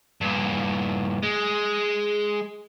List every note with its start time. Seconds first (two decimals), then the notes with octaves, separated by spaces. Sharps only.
0.21 G2 A#2
1.23 G#3